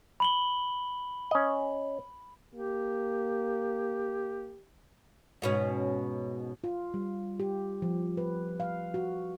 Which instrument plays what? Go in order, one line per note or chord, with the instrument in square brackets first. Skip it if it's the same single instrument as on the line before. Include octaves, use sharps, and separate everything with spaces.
[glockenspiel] B5 F#7 G7
[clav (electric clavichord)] C#4 D#5
[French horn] A#3 [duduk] G4
[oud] G#2 B2 C#4
[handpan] F4
G3
G4
F3
B4
F5
F#4